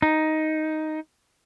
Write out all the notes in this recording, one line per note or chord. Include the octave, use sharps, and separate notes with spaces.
D#4